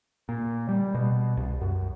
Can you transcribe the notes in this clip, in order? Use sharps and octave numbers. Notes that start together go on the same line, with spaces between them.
A#2
G3
B2
C2
F#2